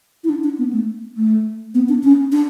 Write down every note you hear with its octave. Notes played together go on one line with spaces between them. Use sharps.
E4
D4
D4
B3
A3
A3
B3
D4
C#4
D4